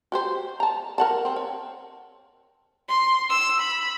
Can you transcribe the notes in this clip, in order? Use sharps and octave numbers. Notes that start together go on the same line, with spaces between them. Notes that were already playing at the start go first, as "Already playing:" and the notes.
F#4 G4 C5
A5 A#5
A#4 F#5 A5
C4
C#5
C6
E6
B5